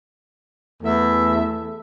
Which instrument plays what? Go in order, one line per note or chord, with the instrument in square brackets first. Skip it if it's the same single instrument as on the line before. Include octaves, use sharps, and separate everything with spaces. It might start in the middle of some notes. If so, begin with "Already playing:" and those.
[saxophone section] E2 E5 [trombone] A3